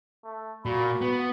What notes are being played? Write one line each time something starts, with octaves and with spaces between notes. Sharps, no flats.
A3
A#2 F#4 B5
B3